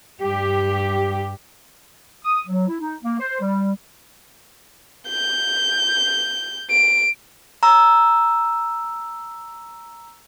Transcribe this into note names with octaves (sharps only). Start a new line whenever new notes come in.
G2 G4
D#6
F#3
E4
D#4
A#3
C5
G3
G6
D7
A#5 E6